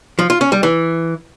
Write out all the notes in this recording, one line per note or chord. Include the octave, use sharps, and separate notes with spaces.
F3
F4
C#4
G3
E3